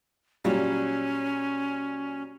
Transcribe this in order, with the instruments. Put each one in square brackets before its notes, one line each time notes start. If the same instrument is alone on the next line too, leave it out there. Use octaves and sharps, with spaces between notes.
[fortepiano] A#2 F#3 G3 [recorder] C#4